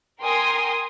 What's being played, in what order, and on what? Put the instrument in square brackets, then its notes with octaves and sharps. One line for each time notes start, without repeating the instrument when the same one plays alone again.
[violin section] A#4 G5 G#5 C6 D#6